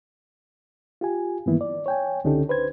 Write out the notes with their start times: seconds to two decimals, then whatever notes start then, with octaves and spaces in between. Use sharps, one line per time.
1.01 F4 G4 G#5
1.46 G2 D#3 E3 A#3 B3 E4
1.61 D5
1.86 C#5 G5 G#5
2.24 C#2 D3 C#4 D#4 G4 A4
2.49 B4 C5 G#6